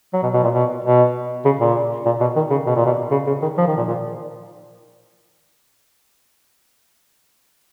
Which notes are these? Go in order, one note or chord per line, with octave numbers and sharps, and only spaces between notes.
F#3
B2
B2
A#2
B2
B2
C#3
A#2
A#2
B2
D#3
C#3
B2
A#2
B2
C#3
C#3
D#3
F3
D#3
A#2
A#2